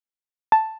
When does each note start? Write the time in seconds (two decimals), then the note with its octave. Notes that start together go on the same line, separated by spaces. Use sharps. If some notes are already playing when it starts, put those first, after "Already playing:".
0.52 A5